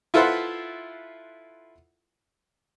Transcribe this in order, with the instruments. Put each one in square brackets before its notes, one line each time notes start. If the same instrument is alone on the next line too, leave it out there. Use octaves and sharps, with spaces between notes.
[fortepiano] E4 F4 A4 B4 C5 F#5